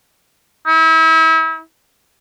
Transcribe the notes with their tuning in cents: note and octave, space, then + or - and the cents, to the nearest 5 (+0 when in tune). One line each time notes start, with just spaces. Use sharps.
E4 -35